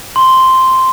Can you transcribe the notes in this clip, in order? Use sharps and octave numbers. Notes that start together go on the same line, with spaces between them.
C6